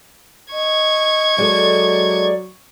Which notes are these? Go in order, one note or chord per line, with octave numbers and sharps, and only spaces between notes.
D#5 C#6 G#6
F#3 G#3 A4 D5